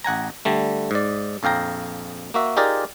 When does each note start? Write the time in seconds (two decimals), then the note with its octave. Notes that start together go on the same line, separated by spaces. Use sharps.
0.04 A1 F#5 G#5 A#5
0.45 D3 G3 A3
0.91 G#2 D5
1.43 A#1 F2 F5 G5 A#5
2.34 A#3 F#4 E5
2.57 D#4 F4 G4 G#4 A#4 D5